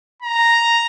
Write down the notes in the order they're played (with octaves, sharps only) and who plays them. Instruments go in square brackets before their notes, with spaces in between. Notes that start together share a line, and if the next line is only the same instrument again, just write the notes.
[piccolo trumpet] A#5